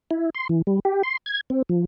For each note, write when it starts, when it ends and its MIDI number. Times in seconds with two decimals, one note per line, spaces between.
0.11 0.30 64
0.35 0.47 84
0.49 0.62 52
0.67 0.79 55
0.85 1.02 67
1.03 1.17 84
1.26 1.41 92
1.50 1.62 60
1.69 1.85 53